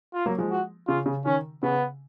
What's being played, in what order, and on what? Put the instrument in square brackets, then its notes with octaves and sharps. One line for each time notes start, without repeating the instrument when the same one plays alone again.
[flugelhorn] F4
[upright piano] F#3 A#3
F3 G#3
[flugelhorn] F#4
[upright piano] C#3 [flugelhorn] F4
[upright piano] C#3
[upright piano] D#3 [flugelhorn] C#4
[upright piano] C#3 [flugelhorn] B3